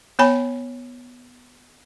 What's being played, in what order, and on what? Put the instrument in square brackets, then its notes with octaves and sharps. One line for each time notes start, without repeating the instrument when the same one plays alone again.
[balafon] B3 C#5 G#5 B5